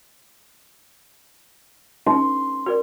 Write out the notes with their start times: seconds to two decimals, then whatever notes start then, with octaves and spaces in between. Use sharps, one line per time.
2.06 C#4 D#4 C6
2.66 F#4 A#4 D5